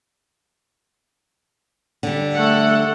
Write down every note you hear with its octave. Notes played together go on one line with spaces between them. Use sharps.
D3 G3
A3 A4 F#5